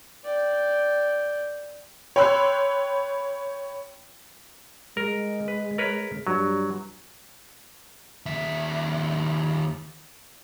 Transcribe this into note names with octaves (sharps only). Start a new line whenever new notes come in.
D5 G5
C#5 G5 B5 C6 E6 F#6
G#3 A#4
B4
A#4 B4 C#5
G2 F#3
D#2 E5